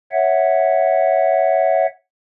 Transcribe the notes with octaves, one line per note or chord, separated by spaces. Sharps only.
C#5 E5 F#5